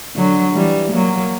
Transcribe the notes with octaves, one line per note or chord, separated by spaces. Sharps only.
D3 F#3
E3 G3
F#3 A#3